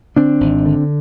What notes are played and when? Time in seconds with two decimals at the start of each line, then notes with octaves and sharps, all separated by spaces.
0.16 D3 C4 D4
0.40 G#1
0.66 D3